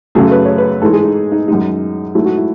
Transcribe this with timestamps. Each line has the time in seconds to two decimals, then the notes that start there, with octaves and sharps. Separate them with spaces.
0.15 F#2 C#3 F#3 A3 G#4
0.31 B4
0.45 C#5
0.58 B4
0.82 G#2 E3 G#3 A4
0.93 G#4
1.04 D#4
1.32 D#4
1.48 F#2 D#3 G#3 D#4
2.15 G#2 F#3 A3 E4
2.26 F#4
2.37 E4